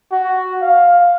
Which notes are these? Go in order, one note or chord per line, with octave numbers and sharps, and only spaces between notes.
F#4
F5